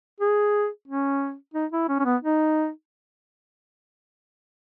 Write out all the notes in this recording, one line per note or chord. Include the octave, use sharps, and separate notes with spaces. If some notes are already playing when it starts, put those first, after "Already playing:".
G#4
C#4
D#4
E4
C#4
C#4
B3
D#4